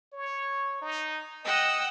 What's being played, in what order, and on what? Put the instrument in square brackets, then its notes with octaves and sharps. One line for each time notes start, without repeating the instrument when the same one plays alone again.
[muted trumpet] C#5
D#4
[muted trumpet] D#5 [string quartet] F#5 G5 E6